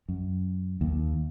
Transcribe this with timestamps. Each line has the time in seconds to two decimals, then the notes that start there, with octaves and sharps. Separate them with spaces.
0.09 F#2
0.81 D#2